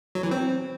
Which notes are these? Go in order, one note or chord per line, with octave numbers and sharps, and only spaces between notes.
F#3
E3
C4